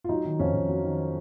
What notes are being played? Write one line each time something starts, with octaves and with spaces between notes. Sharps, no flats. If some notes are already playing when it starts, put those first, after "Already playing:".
F4
F#3 D#4
D#3
F2 C#4
F2
F#3
D#3